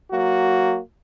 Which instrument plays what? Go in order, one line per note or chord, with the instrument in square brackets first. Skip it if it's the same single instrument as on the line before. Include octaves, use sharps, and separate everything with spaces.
[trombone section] F#3 A#3 F#4